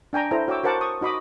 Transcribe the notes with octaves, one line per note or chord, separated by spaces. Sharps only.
D4 G5 G#5 A#5
E4 A4 C5 A#5
F#4 C#5 G5 D6 E6
F#4 A#4 C5 F#5 A5 D6
C#6 D#6
D#4 F#4 D#5 B5 D6 D#6